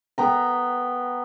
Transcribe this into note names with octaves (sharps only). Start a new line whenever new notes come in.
B3 G5 A#5